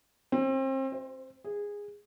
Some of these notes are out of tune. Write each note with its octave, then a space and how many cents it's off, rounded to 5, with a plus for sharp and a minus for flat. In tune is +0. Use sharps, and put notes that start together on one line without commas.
C4 +35
C5 -5
G#4 -15